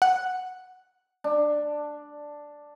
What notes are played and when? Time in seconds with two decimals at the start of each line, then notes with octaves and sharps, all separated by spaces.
0.02 F#5
1.24 D4